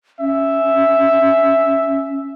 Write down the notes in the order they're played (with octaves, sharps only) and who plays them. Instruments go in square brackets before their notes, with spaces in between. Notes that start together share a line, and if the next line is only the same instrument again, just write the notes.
[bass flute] C#4 [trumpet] E5